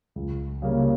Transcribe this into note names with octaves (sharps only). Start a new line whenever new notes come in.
C#2
C#3 G3 A#3 C#4